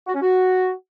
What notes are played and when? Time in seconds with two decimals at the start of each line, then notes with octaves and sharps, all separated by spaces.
0.07 F#4
0.14 C#4
0.21 F#4